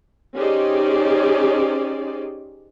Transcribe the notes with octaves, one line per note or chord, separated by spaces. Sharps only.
C#4 D#4 G4 G#4 C5 D5